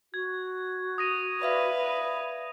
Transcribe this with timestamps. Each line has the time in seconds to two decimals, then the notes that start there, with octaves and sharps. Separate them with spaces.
0.14 F#4 G#6
0.98 D#6 A#6 D#7
1.42 B4 D5 E5 F5